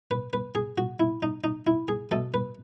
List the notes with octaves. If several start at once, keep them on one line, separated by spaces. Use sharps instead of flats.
B4
B4
G#4
F#4
E4
D#4
D#4
E4
G#4
B2 A3 A4
B4